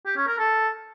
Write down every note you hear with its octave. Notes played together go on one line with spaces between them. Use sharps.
G4
C#4
A#4
A4